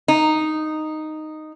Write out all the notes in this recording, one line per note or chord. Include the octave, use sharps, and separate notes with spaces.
D#4